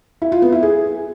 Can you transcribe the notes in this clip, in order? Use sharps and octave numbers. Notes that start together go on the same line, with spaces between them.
E4
F4
B3
E4
G#4